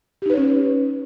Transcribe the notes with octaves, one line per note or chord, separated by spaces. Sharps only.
C#4 D#4 G4 B4 C#5